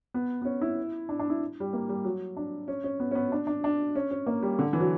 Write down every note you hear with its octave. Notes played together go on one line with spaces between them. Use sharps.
B3
B3
C#4
E4
D4
D4
E4
G3
A#3
G3
F#3
D4
C#4
C#4
B3
C#4
B3
D4
D4
D4
C#4
C#4
A#3
G3
D3
E3
F#3